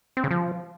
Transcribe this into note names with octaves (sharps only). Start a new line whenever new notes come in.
C4
C#3
F3